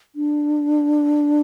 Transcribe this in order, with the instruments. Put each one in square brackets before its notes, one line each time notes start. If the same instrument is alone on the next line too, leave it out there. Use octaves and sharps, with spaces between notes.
[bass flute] D4